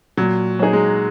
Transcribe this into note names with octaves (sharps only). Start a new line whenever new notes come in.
A#2 F#3
F#3 D#4 G#4
G#3